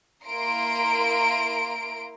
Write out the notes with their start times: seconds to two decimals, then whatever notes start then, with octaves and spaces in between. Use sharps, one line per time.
0.25 A#3 E4 A#5 C6 D7